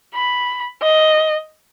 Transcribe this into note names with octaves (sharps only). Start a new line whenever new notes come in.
B5
D#5